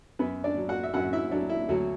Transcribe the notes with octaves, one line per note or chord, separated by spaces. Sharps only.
F#2 B3 B4
D4 D5
F#3
F#4 F#5
E5
F#2 F#4 F#5
E4 E5
F#3 D4
E4
D2 F#3 F#4